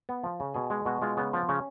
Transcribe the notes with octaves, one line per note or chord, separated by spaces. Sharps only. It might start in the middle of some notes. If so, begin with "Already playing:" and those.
B3
F3
C#3
B2 G#4
G#3
B2 F#4
G#3 F4
C#3 B3
F3
C#3 C#4